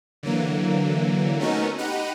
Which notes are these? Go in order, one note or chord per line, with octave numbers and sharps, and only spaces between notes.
D3 E3 F#3 A#3
A3 B3 C#4 D#4 F#4 A#4
D#4 G4 F#5 B5 F#6 D#7